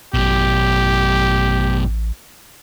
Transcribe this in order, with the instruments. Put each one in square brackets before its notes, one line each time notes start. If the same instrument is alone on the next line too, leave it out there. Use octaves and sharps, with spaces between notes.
[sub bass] A1 [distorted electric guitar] F#2 B2 [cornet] G4